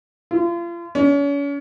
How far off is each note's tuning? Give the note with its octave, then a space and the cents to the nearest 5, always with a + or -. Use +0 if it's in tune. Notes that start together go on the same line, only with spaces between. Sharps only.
F4 -35
C#4 +40